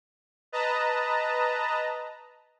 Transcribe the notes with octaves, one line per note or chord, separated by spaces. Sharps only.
B4 D#5 A5 A#5